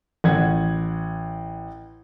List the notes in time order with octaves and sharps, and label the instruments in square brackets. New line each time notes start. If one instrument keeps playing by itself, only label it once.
[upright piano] A1 F#5 G#6